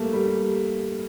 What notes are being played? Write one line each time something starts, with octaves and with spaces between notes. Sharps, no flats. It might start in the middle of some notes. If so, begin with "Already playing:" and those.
Already playing: G3 A3 A#3
G3